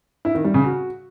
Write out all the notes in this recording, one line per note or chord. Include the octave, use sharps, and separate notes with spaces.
E4
D#3
G3
C#3
F#4